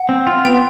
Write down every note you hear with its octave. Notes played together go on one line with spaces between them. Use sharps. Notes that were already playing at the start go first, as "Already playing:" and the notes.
Already playing: F#5
C4
F4
B3 G5